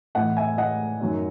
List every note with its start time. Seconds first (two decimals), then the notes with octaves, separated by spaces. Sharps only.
0.15 A2 E3 D#5 F#5
0.37 E5 G#5
0.58 D#5 F#5
1.00 F#2 D#3 F#3